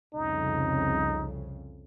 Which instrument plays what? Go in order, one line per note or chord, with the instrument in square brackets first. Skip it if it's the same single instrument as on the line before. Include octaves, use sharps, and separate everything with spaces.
[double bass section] C2 F2 C#3 [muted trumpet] D#4